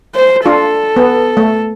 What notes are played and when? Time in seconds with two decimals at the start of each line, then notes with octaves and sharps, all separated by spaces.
0.15 C5
0.46 D4 F4 A4
0.96 B3
1.37 A3